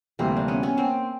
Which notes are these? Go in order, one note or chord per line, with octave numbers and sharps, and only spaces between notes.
D2 C3 E3 G3 A#3 C4
D4
B3 C#4
B3 C#4
A#3 C4